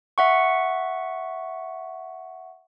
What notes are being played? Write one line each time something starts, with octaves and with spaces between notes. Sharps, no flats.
E5 F#5 C#6